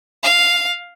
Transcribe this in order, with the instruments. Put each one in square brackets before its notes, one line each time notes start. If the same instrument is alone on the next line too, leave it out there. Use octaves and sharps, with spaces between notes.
[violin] F5